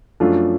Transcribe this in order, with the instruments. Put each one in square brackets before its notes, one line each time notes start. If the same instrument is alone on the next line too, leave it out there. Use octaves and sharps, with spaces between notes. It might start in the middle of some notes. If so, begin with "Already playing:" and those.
[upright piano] F#2 F3 A3 D4 F4